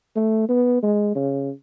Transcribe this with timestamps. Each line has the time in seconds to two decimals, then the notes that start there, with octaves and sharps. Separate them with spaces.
0.16 A3
0.49 B3
0.83 G#3
1.15 C#3